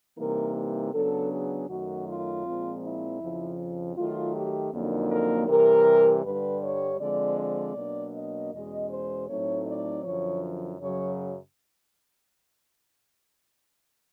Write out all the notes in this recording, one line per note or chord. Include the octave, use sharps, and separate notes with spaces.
C3 E3 G3 A#3 D#4 A#4
C#3 F#3 B3 D4 A4
G#4
F#2 D#3 F#3 A3 F#4
F4
A#2 F3 G#3 C4
E4
F2 C#3 F3
D#3 F#3 A3 F4
G4
F2 D3 F#3 A#3 D#4
A#4
C3 E3 G3 A#4
G2 D3 G3 B4
C#5
D3 F3 G#3 C4 D5
D5
B2 F#3 A#3 D4
D#5
E2 B2 G#3 C#4 D#5
C5
A2 F#3 A3 C4 D#4 C#5
D5
F#2 D3 F3 C#5
F#2 C#3 F#3 C#5